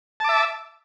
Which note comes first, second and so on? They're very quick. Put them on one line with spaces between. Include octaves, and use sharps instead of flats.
A5 D6 E5